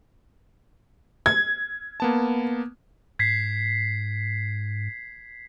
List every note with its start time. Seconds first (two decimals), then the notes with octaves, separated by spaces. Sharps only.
1.26 G#6
2.00 A#3 B3 A5
3.19 G#2 G#6 B6 C7